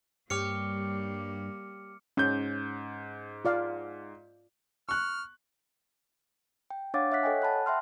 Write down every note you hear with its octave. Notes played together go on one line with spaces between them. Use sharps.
G2 G3 A#3 G4 C#5 D6 F6 C#7
G#2 C#4 G6
F4 D5 F5
C#6 F6 F#6
G5
D4 C#5 F5 F#5 D6 A6
C#5 E5 F#5 F#6 B6
A4 C#5 D#5 G5 G#5
F#5 A5 B5 F#6
E5 G5 C6 F6